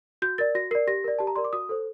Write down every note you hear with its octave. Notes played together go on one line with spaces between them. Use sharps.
F#4 G6
A#4 D5 A6
F#4 A#6
A#4 D5 C7
G4 A#6
A#4 D5
G4 A5
A#5
A#4 D5 C6
D6
F#4 D#6
A4 C5